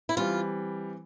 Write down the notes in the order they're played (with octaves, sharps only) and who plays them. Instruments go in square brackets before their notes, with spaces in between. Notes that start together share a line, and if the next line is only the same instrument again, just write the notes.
[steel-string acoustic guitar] E4
[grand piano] E3 G3 C4 [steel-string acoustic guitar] F4